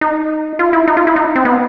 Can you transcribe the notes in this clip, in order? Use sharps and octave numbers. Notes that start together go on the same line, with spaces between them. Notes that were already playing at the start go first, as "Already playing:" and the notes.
D#4
F4
E4
D#4
F4
E4
D#4
C4
B3